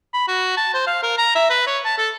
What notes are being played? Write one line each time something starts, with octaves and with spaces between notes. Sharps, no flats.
B5
F#4
A5
C5
F5
A#4
A#5
E5
B4
C#5
A5
A4